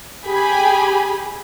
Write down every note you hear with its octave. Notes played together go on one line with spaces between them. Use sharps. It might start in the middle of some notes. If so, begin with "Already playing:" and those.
G4 G#4 G#5 B5